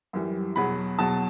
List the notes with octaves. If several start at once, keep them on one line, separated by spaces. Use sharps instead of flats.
F#2 E3 G3
E2 B2 F#3 B5
E2 B2 F#3 A5